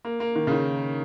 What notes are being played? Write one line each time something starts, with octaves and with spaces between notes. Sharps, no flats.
A#3
A#3
D#3
C#3
D#3